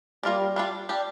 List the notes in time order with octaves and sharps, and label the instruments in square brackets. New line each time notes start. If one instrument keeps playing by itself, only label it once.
[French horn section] G3 [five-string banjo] A#3 F4 A#4 D5
[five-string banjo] G3 D4 F4 D5
G3 D4 G4 D5